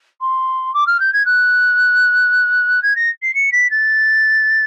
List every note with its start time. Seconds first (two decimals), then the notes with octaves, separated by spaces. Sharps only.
0.21 C6
0.74 D6
0.87 F6
1.00 G6
1.13 G#6
1.25 F#6
2.82 G#6
2.96 A#6
3.22 C7
3.34 C#7
3.52 B6
3.70 A6